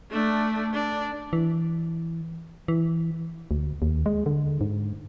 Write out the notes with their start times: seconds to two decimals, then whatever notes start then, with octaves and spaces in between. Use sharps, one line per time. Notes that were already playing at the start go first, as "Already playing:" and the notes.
0.11 A3 D4
0.74 D4
1.33 E3
2.68 E3
3.51 D2
3.82 D#2
4.06 G#3
4.26 D3
4.61 G#2